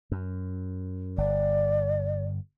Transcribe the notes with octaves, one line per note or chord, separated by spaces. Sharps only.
F#2
G1 D5